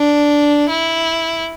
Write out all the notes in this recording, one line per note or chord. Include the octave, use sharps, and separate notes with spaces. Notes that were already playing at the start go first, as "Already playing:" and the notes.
Already playing: D4
E4